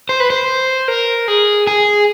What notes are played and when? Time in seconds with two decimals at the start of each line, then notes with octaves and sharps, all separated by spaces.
0.09 C5
0.20 B4
0.30 C5
0.88 A#4
1.28 G#4
1.67 G#4